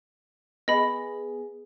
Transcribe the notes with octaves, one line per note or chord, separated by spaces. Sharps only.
B3 G#4 D#5 B5